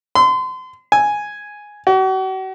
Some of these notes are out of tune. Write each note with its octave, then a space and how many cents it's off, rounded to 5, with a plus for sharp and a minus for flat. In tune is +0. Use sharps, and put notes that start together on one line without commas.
C6 -35
G#5 +0
F#4 +40